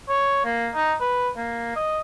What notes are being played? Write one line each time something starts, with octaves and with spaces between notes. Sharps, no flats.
C#5
A#3
D#4
B4
A#3
D#5